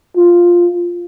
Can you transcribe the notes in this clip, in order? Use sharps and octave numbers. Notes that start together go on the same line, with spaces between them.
F4